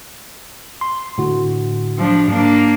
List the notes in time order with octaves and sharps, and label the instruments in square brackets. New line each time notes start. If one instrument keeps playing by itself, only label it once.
[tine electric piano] C6
A2 D3 F#4
[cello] F3 D4
[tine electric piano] G#2 [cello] A#3 D4